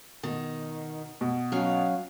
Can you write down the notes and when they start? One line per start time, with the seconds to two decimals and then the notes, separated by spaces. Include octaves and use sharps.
0.23 B2 D#3
1.21 B2
1.52 F#3 C#4 F5